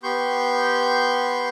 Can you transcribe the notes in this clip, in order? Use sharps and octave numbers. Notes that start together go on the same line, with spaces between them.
B3 G4 C6 C#6 G6